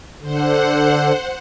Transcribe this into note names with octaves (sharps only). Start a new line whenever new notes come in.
D3 C5 F#5